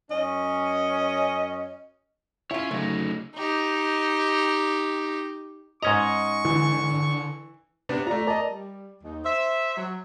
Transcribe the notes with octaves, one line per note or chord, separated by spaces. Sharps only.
F#2 C#4 D#5
C#4 E4 F4 C#5 E5
D2 C#3 F#3 A3 D#4
D#4 G4
G#2 C#4 D#5 A#5 C#6
D3 E3
C3 B3 D4
A3 F4 D5 A#5
A#4 D5 D#5 A5 A#5
G3
D#2 D#4
C5 E5
F#3